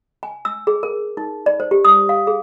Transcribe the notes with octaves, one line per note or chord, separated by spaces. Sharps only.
G#5
E6
G#4
A#4
D#4
D5
C5
G4
D#6
F5
G#4